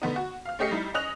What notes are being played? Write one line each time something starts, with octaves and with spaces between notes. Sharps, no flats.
D3 B3 D#4
F#4
F5 F6
A3 C#4 G4 D#5 C7 C#7
G3 D#4 E4
C#4 D#5 D#6 F#6 F7